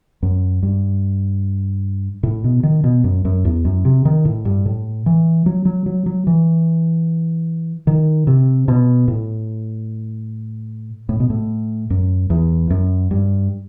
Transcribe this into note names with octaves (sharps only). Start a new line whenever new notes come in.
F#2
G2
A2
B2
D#3
B2
F#2
F#2
E2
F#2
C3
D#3
A2
G2
A2
E3
F#3
F#3
F#3
F#3
E3
D#3
C3
B2
A2
A2
B2
A2
F#2
E2
F#2
G2